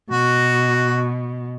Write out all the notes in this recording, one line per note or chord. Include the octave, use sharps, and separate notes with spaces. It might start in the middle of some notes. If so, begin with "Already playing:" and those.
B2 F#4